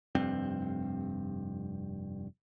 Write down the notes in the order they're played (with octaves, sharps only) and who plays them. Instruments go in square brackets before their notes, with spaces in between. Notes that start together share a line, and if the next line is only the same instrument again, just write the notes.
[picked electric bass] F1 G2 C4